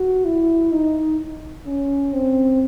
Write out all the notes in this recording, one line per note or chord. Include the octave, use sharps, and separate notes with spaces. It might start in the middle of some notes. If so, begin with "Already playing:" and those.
Already playing: F#4
E4
D#4
C#4
C4